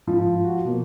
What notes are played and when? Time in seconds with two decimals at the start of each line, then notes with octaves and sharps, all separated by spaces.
0.07 G#2 F3
0.45 F#4
0.65 B2 F3 A#3